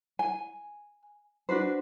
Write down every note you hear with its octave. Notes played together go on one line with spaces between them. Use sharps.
G#5
D4 F#4 B4 C5